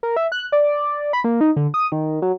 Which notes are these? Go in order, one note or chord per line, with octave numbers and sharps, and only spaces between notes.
A#4
E5
F#6
D5
B5
A#3
D#4
D3
D#6
D#3
F#3